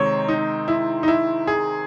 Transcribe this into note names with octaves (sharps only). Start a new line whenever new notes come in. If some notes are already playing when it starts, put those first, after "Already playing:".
Already playing: C3 D#3 G#3 C4 C#5
D#4
E4
D#4
E4
G#4